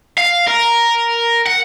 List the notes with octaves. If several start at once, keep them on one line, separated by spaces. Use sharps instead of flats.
F5
A#4
F#5